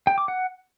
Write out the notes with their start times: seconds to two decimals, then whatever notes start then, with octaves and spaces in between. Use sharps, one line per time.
0.07 G5
0.18 D6
0.28 F#5